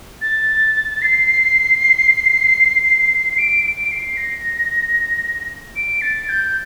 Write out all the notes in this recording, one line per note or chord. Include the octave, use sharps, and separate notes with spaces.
A6
C7
D7
D7
D7
C7
A#6
D7
A6
G6